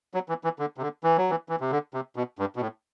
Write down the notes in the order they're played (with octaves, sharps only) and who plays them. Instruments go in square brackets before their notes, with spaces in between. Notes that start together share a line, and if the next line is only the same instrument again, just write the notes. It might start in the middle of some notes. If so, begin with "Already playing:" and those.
[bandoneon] F#3
E3
E3
D3
C3
D3
E3
F#3
E3
E3
C3
D3
C3
B2
G2
B2
A2